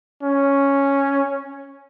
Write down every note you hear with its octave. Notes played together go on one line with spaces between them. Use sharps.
C#4